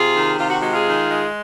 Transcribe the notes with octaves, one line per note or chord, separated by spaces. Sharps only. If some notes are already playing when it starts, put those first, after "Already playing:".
Already playing: C3 F4 G#4
D#3
C3 F4
F#4
G#3 F#4
F4 G#4
D#3
G#3